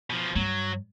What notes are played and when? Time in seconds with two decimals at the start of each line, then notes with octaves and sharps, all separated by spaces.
0.10 B2 F3
0.36 G2 F#3